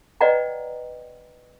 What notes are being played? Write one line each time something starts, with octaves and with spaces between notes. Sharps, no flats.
B4 D5 D#5 F#5 G5 A#5